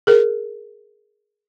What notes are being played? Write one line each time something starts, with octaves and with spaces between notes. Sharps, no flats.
G#4 A#4